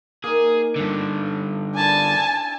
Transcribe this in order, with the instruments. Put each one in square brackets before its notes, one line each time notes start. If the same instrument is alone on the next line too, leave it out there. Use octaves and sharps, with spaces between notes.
[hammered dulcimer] A#3 D#4 [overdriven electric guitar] G#4
[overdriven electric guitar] G2 D3
[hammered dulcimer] D4 E4 [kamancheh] G#5 A5